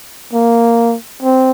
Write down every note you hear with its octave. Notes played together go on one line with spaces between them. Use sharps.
A#3
C4